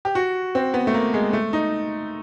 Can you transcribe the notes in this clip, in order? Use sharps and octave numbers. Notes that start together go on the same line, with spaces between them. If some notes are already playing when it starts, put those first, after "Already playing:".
G4
F#4
C4
B3
A3
A#3
G#3
A3
D#4